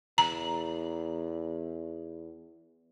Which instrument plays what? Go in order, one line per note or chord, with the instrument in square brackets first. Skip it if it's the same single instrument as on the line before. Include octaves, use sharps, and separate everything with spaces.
[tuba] E2 [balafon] A#5